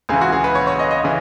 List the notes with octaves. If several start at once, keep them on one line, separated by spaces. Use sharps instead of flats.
C#2 C#3 E3 G#4
F#4
G#4
B4
C#5
C#5
D#5
D#5
C#3 E3